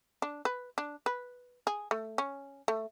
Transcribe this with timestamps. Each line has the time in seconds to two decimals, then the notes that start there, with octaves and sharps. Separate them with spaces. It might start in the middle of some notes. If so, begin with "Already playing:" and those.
0.22 D4
0.45 B4
0.78 D4
1.06 B4
1.67 G#4
1.91 A3
2.18 C#4
2.68 A3